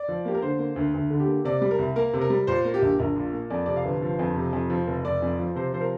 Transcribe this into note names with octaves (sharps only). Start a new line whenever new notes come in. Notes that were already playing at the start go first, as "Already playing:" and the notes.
Already playing: D5
F3
A#3 G4
A#4
D3 C5
A#3
D2
D2
D3
G4
A#3
C3 D5
G3
A#4
C2
A#3 A#4
C3
A#4
G3
A#2 C5
A#3
G4
A#1
A#1 A#4
A#2
A#3
F2 D5
C3 D5
F5
G1
F3
F2
C3
F2
F3
F1
F1 D5
F2
F3
C3 C5
F3 C5
A#4